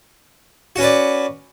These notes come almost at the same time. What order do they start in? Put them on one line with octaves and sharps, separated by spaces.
F#4 C#4 B4 D5